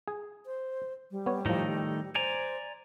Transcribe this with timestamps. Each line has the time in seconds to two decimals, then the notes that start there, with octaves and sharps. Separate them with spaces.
0.08 G#4 G#5
0.46 C5
1.11 G3
1.26 B3 C#5
1.46 A2 D#3 F3 A3 D#4
2.15 C5 D5 G#5 A#5